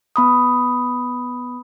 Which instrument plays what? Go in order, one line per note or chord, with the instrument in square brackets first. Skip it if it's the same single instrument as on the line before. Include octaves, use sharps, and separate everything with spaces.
[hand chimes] B3 B5 D#6